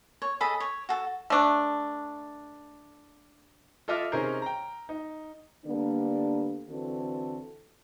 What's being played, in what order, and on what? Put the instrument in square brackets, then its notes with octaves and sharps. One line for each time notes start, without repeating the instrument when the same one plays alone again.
[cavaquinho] C#5
G#4 A4 D#5 B5
C#5
F#4 A4
[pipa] A3 D4
[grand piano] F4 A4 D#5 E5 D6 F6
C3 C#4 D#4 G#4 A#4 C5
G5 A#5
D#4
[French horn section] D3 G3 A#3 B3 D4
D3 E3 C4 F#4 A4